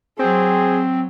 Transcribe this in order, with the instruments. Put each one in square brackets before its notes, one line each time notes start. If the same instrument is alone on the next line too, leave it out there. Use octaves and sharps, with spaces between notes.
[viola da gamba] F#3 [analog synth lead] C4 [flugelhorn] G#4